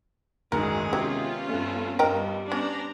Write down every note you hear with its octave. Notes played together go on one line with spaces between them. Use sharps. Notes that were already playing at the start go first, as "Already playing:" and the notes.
F#1 D2 G#2 D#3 G#3 G#4 A#4
C3 F#3 B3 C#4 F4 G4 G#6
G2 A3 C4
G2 G3 A#4 D#5 G5 A#5
B3 C#4 D4 C5 A#5